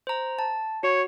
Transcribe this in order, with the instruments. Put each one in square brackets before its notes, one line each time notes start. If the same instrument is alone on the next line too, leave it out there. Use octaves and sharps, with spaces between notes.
[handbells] C5 A#5
A5
[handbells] F#4 [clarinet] C#5